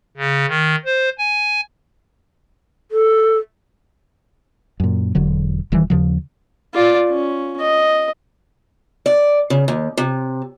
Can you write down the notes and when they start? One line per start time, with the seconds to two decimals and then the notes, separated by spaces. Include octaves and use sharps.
0.17 C#3
0.48 D#3
0.85 C5
1.18 G#5
2.91 A4
4.80 F#2 A#2
5.15 E1 D3 F#3
5.72 D#1 D#3 E3 G3
5.90 D#2 C#3 F3
6.74 F4 D5
7.09 C#4
7.61 D#5
9.06 D5
9.50 C#3
9.68 D#2
9.97 C3